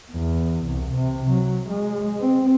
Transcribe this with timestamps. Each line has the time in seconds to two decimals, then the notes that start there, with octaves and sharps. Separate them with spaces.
0.12 E2
0.66 C2
0.95 C3
1.31 F#3
1.69 G#3
2.20 C4